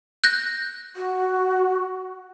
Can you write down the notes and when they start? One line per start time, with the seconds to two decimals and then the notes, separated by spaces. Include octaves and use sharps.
0.24 F#6 G6 A#6
0.96 F#4